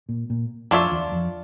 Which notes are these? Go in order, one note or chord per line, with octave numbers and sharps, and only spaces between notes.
A#2
A#2
F2 D4 F4 C#5 E5
E2
F2